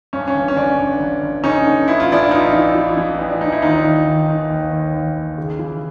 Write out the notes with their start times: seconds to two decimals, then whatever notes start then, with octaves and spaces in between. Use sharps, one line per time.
0.13 G2 C#4
0.28 C#4
0.35 G1
0.48 C#4
0.56 G1 D4
0.79 G1
1.00 G1
1.23 G1
1.44 D3 C#4 D#4
1.66 D3
1.88 A1 E4
2.00 F4
2.10 A1 D4 E4
2.31 A1 D#4 F4
2.53 E3
2.75 E3
2.97 E3
3.19 A1
3.30 D4
3.41 A1 D#4
3.52 E4
3.62 D#2 D#4 F4
3.85 D#3
4.06 D#3
4.28 D#3
4.50 D#2
4.72 D#2
4.94 D#2
5.16 D#2
5.38 C#3
5.59 E3